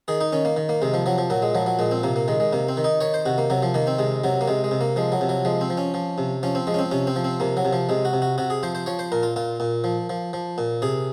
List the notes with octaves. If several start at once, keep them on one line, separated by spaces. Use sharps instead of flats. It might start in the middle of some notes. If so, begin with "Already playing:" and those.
D#3 G#4
D#4
D#3 C#4
A#3
D#3
A#3
C3 G#3
F3
F3 F#3
F3
A#2 F#3
G#3
F3 F#3
F#3
A#2 G#3
C4
C3 A#3
A#3
D#3 G#3
G#3
C3 A#3
C4
D#3
D#4
D#3 C#5
C5
C3 F#4
A#3
C3 F#3
F3
D#3 A#3
C4
C3 G#3
C3 F#3
A#3
C3 G#3
G#3
C3
A#3
F3 G#3
F#3
C3
F#3
F3 G#3
C4
F3
C#4
F3
C3
F3 C#4
C4
F3 G#3
C#4
C4
C3 C#4
C4
F3
C4
C3 A#3
F#3
C3
F3
C3 G#3
F#4
C3
F#4
C3 F#4
G#4
F3 C5
C5
F3 C#5
C5
A#2 A#4
F4
A#2 F4
A#2
F3
F3
F3
A#2
C3 G#4